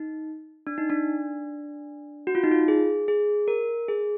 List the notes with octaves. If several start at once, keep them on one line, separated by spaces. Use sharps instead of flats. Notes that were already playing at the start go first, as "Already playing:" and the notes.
Already playing: D#4
D4
D#4
D4
F#4
F4
D#4
F4
G#4
G#4
A#4
G#4